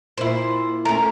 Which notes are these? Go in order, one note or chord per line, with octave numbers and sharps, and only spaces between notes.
A#2 E4 C5
A3 C#4 A#4